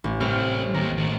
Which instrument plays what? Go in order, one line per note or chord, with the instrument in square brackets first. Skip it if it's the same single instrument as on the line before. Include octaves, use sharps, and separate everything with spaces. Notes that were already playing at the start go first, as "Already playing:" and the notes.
[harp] A1
[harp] A2 C4 F6 [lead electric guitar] C3 G3
[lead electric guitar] D#2 [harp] A#5
[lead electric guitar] A2 D#3